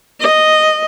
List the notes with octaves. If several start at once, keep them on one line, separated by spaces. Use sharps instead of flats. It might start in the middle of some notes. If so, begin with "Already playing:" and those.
D#5